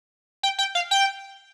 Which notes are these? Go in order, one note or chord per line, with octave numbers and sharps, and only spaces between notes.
G5
G5
F5
G5